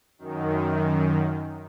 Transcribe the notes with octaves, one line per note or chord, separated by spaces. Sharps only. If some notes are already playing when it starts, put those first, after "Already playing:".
F#2 D#3